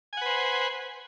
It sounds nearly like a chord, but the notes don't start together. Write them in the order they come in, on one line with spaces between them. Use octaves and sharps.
G#5 F#5 B4 C5